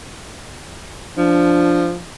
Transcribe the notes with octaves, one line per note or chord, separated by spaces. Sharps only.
F3 D4